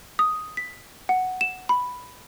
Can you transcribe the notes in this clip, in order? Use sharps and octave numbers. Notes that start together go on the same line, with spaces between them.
D#6
B6
F#5
E7
B5